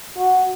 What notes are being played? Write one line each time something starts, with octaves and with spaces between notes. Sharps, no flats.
F#4